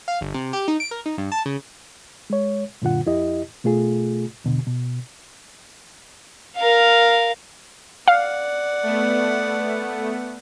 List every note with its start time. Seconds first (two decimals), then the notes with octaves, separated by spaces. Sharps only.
0.08 F5
0.21 G1
0.34 C3
0.53 G4
0.68 D#4
0.80 D7
0.91 A#4
1.06 D#4
1.18 G2
1.32 A5
1.46 C#3
2.30 G#3 C#5
2.82 F#2 A#2 D3 F4 F#5
3.06 F2 E4 G4 D#5
3.64 B2 A3 F4 G#4
4.44 E2 B2 D3
4.67 B2
6.57 A#4 F5
8.08 D5 F5 F#5
8.83 A3 B3